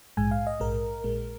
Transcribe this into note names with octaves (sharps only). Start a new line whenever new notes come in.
A#1 G#2 G#3 G#5
F5
D#5
A#1 G#2 G#3 A#4
A#1 A#2 G#3